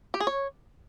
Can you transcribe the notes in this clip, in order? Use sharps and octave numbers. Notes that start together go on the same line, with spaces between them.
G4
G#4
C#5